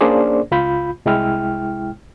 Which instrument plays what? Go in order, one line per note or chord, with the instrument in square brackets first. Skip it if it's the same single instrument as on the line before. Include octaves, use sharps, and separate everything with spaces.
[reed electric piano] A#3 C#4 D4 G#4 C5 D5
C#2 F4 B5 G6
C2 G#3 E4 G5 F6